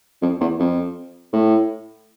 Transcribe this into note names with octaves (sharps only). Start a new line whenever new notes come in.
F2
E2
F2
A2